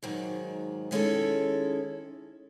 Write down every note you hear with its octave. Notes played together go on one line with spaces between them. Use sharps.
G#2 D#3 F#3
D#3 G#3 C#4 E4 A4